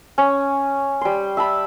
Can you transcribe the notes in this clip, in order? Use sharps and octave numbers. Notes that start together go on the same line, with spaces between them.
C#4
G3 C6
E5 A5 B5